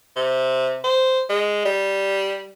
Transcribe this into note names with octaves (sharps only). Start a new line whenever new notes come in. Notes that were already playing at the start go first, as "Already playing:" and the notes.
C3
C5
G#3
G3